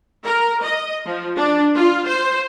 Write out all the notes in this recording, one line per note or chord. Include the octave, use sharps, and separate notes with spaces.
A#4
D#5
F3
D4
F4
C5